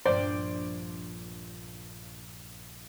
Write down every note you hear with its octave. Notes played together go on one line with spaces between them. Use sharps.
A#1 G2 A#2 C5 D5